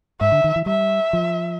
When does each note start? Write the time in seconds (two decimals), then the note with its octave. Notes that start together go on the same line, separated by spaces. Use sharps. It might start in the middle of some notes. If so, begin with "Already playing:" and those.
0.21 G#2 E5
0.32 D3
0.44 D#3
0.56 E3
0.66 G3 E5
1.13 F3